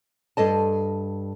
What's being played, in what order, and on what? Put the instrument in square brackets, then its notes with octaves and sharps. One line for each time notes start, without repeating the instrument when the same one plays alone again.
[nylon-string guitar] G2 A4 D#5 A5